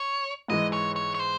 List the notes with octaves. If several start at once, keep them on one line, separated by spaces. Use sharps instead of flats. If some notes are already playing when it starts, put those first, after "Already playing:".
Already playing: C#5
G#2 E3 G#3 D#5
C#5
C#5
C#5
C5